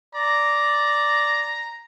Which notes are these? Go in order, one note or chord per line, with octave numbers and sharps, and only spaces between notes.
D5 A#5